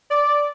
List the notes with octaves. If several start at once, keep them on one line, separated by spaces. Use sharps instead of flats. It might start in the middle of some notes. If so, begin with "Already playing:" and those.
D5